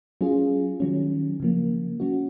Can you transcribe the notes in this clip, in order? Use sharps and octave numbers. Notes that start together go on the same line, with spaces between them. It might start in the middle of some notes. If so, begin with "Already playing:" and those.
F#3 C#4 F4 G#4
D#3 F#3 C#4
C#3 F3 A#3
F#3 C#4 F#4